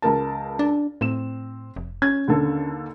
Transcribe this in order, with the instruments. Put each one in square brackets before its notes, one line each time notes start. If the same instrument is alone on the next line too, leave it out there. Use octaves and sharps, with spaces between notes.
[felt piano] C#2 A#4 A5
[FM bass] D4
[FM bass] A2 [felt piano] C4 E7
[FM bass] F1
[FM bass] C#4 [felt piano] G#6
[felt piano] D#2 D3 A4